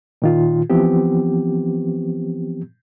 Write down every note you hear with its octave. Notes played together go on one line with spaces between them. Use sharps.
A#2 D#3 F4
E3 F3 B3 C4 G4